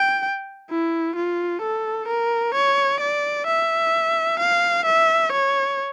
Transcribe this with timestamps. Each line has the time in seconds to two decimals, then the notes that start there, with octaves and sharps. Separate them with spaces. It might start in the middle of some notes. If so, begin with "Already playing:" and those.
Already playing: G5
0.70 E4
1.16 F4
1.62 A4
2.08 A#4
2.55 C#5
3.01 D5
3.47 E5
4.40 F5
4.86 E5
5.33 C#5